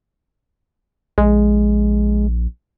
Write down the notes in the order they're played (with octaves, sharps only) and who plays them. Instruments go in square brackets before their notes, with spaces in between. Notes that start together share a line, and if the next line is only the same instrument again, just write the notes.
[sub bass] A#1 [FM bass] G#3